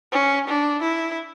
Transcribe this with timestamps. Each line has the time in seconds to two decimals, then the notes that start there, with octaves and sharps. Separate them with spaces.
0.12 C#4
0.48 D4
0.82 E4